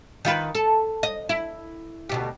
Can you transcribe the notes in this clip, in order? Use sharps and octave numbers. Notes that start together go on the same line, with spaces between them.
D#3 F4 B4
A4
D#5
E4
D2 B2 G4